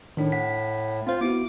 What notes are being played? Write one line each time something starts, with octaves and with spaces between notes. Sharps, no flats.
A2 D#3 D4
F#5 B6
C4 F4 C5
B3 E4 F#4 D6